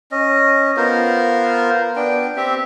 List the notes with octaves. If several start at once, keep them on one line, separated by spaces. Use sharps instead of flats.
C#4 D#5
B3 F4 A#4 C5
B3 D4 G5
C4 G4 E5